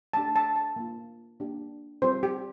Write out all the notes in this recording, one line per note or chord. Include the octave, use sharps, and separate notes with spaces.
A3 D4 G4 A5
A5
A5
A#3 F4
A#3 D4 G4
G3 C4 F4 C5
G4